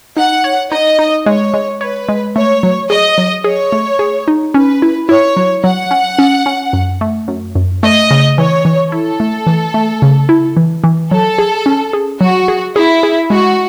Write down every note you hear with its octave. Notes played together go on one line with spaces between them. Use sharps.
D#4 F#5
C#5
D#4 D#5
D#4
G#3 C#5
G#3
B4 C#5
G#3
A3 C#5
F#3
G#4 D#5
F#3
G#4 C#5
A3
G#4
D#4
C#4 B4
E4
E4 C#5
F#3
F#3 F#5
C#4
C#4
C#4
F#2
A3
F#2
F#2
A3 D#5
C#3
E3 C#5
E3
E4 A4
A3
E3
A3
C#3
E4
E3
E3
F#3 A4
G#4
C#4
G#4
F#3 F#4
G#4
E4 G#4
G#4
G#3 F#4